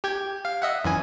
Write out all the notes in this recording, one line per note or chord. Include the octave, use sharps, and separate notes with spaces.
G4 G5 G#6
F5
D#5 E5 F#5
F#2 E3 G#5